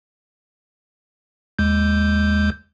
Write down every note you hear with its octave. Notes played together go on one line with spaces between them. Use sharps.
D#2 G#3 G6